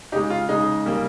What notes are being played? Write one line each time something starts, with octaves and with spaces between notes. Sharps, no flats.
C#3 G#3 D#4 G4
F4
C#3 G#3 D#4
C#3 G3 A#3